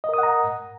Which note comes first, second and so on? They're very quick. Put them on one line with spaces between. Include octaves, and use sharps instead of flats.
D#5 A#4 D#6 F#5 A#5